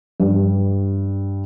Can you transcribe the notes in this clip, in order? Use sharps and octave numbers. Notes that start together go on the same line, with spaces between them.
G2